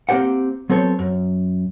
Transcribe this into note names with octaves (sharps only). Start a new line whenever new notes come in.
A#3 C4 G4 C5 F#5
F#3 B3 C4 A4 C5 C#5
F#2